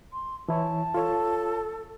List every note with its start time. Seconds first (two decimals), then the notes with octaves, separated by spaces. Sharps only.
0.13 C6
0.48 E3 E4 C#5 A5
0.94 F4 A4 C#5